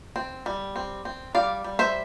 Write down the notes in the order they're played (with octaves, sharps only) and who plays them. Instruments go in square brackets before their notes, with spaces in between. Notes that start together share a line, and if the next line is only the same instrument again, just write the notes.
[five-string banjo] C4
G3
C4
C4
G3 D5 F5
G3
C5 E5